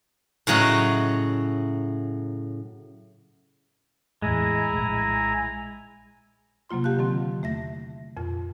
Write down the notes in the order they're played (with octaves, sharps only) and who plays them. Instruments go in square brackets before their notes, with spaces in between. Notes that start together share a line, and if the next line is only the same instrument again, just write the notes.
[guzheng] A2 C#3 F#3 D#5 F#5
[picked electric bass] E2 A2 [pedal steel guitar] G#3 [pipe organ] E4 G#5 A#5
[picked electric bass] A#1 A2
[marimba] C3 F#3 A#3 F4 C6
G4 F5 A5 F#6
D3 D#3 F#3 C4
E2 A3 E5 A#6
F2 A#2 F4